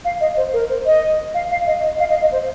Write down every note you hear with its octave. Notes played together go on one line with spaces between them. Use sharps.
F5
D#5
C5
A#4
C5
D#5
F5
F5
D#5
D#5
F5
D#5
D#5
C5